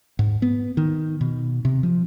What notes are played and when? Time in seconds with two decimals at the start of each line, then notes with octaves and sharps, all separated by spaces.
0.19 G#2
0.42 B3
0.77 D#3
1.21 B2
1.65 C3
1.83 F3